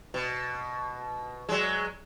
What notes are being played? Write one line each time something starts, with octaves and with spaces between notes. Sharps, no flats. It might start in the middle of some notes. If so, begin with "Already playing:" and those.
B2
F#3 G#3